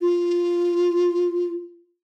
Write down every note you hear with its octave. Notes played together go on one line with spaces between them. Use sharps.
F4